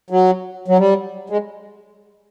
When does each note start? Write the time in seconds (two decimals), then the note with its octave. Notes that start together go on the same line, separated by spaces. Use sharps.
0.10 F#3
0.68 F#3
0.78 G3
1.30 G#3